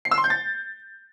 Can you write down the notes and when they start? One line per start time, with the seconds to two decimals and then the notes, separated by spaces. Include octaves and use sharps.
0.05 C7
0.11 E6
0.18 C6
0.24 G6
0.30 A6